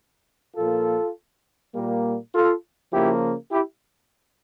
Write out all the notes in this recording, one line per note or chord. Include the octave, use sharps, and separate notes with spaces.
A#2 F3 A#3 F4 A4
A#2 G3 A#3
F4 A4
C#3 F3 A#3 E4 G4
E4 G4